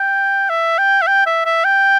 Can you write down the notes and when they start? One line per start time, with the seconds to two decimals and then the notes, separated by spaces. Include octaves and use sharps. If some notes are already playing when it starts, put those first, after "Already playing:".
Already playing: G5
0.50 E5
0.78 G5
1.02 E5
1.07 G5
1.26 E5
1.45 E5
1.64 G5